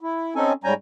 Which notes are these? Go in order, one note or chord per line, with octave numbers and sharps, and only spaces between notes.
E4
C4 C#4 D#4 A4 G#5
G#2 G3 C#4 G5 G#5 A#5